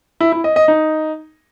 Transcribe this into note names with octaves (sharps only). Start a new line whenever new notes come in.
E4
E4
D#5
D#5
D#4